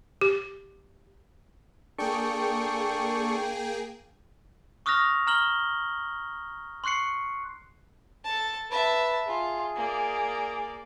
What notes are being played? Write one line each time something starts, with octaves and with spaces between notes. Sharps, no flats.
G4
A#3 D4 G#4 A4 G5 C#6
C#6 D#6 F6 F#6 A#6 F7
A#5 F6 F#7 G7
C6 C#6 F#6 C7 C#7
A4 A5
B4 E5 A5
F4 G#4
A#3 D5